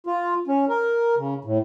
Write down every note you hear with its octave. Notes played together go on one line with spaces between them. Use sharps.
F4
C#4
A#4
C#3
A2